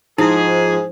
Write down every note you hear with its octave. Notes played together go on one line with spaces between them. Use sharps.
G#2 F3 D#4 E4 G#4